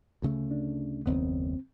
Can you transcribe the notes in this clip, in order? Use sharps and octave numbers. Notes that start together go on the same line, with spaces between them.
D2 C#3 A3
D4
F#1 D#2 B3 C4